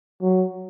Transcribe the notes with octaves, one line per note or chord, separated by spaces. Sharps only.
F#3